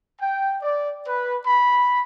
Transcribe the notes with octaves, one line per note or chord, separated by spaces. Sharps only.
G5
D5
B4
B5